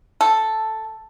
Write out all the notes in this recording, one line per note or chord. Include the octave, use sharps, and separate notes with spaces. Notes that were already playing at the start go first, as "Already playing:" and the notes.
A4